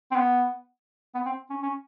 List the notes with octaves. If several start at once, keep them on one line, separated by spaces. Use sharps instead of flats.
C4
B3
B3
C4
C#4
C#4